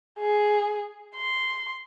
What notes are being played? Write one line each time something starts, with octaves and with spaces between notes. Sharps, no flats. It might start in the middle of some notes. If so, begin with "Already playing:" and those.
G#4
C6